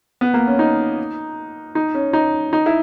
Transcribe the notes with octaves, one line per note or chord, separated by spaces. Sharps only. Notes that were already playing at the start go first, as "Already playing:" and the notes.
B3
A#3
C#4
D#4
D#4
C#4
D#4
D#4
E4